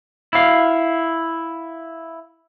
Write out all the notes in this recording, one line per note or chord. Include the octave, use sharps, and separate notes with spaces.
E4 F5